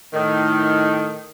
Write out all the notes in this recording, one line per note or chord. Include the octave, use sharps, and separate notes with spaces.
A2 D#3